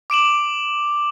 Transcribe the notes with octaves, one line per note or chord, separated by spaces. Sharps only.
D6 D7 E7 F#7